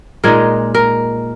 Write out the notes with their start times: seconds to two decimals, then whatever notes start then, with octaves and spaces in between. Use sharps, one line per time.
0.24 A#2 G#3 D#4 A#4
0.75 A#4